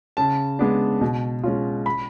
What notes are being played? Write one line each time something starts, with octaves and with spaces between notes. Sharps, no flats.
C#3 A5
G#3 B3 D4
B2
G#3 C#4 F4
B5